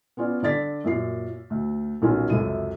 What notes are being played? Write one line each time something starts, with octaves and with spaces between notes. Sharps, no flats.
B3 C#4 F4 D5
D3 D5 A6 B6
F#2 A#2 C7
D2
D#1 B1 D#3 C#4 D#4 F4
C#2 F#2 C3 A4 D#7